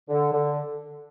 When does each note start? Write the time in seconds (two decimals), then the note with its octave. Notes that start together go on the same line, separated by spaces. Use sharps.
0.09 D3
0.33 D3